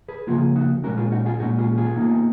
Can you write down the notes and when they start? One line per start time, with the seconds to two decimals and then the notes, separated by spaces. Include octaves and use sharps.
0.08 G#4 B4
0.27 C#3 F3 A#3 F4 G#4
0.56 D#4 F#4
0.84 A#2 G#3 C#4 F#4 A#4
0.98 F4 G#4
1.12 D#4 F#4
1.26 F4 G#4
1.40 A#2 G#3 C#4 D#4 F#4
1.58 F4 G#4
1.77 F4 G#4
1.96 B2 A#3 D#4